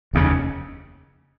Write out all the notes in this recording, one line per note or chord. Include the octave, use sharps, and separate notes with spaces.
F1 D#2 C#3